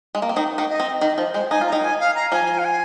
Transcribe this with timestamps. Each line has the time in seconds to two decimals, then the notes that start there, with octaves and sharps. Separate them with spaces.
0.15 G#3
0.22 A#3
0.29 C4
0.36 D#3 D#4
0.58 D#3 D#4
0.69 D#5
0.80 C4
1.01 D#3 D#5
1.17 F3 C5
1.34 G#3 C5
1.50 D#4 G#5
1.61 F4
1.66 A#5
1.72 D#3 D#4
1.83 G#5
2.00 F5
2.15 A#5
2.32 F3 F4 G#5
2.59 F5
2.65 G#5